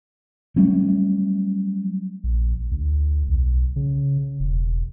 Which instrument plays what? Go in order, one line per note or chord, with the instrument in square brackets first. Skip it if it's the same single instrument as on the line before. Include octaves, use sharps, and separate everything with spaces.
[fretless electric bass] F#3 G3 A3 C#4
[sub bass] A#1
D2
B1
C#3
E1